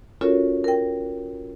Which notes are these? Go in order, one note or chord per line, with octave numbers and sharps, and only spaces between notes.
C#4 F4 F#4 A4 A#4 C#5
A#4 G5